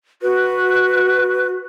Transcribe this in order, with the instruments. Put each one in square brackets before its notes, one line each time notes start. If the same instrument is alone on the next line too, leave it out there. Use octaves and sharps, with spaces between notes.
[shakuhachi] F#4 [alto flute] B4